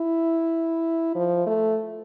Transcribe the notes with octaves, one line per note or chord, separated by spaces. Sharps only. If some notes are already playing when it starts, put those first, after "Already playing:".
Already playing: E4
F3
A3